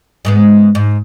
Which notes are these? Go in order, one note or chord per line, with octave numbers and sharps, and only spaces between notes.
G#2 G#3 B3
G#2